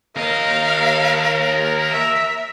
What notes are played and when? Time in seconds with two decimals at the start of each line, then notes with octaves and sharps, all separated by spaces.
0.16 D#2 A#4 D#5 F5
1.91 E5